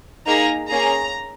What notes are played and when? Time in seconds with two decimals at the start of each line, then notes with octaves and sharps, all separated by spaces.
0.27 A#3 D#4 G#4 A#5
0.69 A#3 C#4 G#4 A#5